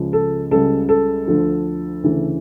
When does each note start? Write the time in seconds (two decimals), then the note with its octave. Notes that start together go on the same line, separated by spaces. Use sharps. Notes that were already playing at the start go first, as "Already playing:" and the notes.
Already playing: C#2 C#3 F3
0.13 A4
0.51 C#2 C#3 G3 A4
0.89 A4
1.27 D2 D3 F3
2.04 D2 C#3 E3